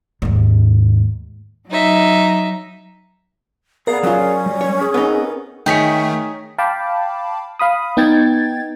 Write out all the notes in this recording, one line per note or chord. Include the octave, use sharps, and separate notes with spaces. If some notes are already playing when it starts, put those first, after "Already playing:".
D#2 G#2
F#3 D#4 E5
B3 G#4 A#4 D5 F5
F#3 C#4 F4
G3
C#5
G#4
B3 C4 D#4
D#3 A3 D#4 G#4 C#5 G5 B6 C#7
F5 G5 A5 B5 D6
F5 B5 D#6
B3 D#4 G5 G#6 A6